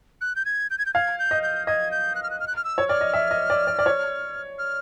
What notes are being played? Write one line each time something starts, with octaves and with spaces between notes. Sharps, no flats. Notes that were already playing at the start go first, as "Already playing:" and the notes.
F#6
G6
G#6
G6
G#6
G6
F5 G#6
G6
D#5
G6
D#5 G#6
G6
F#6
F6
F#6
F6
F#6
F6
E6
C#5
D5 F6
D#5
E5
D#5
D5
D5
D5
C#5
F6